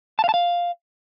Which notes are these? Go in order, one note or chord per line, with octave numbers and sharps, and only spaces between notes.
A5
F5
A5
F5